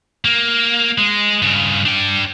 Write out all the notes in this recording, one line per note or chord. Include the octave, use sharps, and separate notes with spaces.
A#3
G#3
G2 C#3
D4 G5